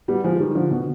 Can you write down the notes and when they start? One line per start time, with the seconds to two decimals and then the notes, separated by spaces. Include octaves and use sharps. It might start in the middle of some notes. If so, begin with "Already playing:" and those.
0.08 G3 B3
0.24 F3 G#3
0.40 D#3 G3
0.55 D3 F3
0.71 B2 D3